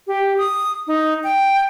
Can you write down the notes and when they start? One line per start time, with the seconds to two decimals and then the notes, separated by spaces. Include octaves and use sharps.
0.07 G4
0.38 D#6
0.87 D#4
1.24 G5